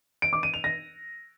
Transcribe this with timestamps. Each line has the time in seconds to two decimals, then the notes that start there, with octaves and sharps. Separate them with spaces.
0.22 D7
0.33 D6
0.43 D#7
0.54 F7
0.64 A#6